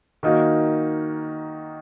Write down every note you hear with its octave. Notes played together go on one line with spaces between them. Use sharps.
D#3 A#3 D#4 F#4